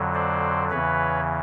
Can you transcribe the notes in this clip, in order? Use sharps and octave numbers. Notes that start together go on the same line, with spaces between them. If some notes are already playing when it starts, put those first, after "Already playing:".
Already playing: F2 D3 F#3
C5 D5
E2 C#3 E3 B4 C#5